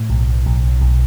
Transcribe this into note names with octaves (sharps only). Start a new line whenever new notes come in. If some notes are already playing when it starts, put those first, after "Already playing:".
Already playing: A2
B1
B1
B1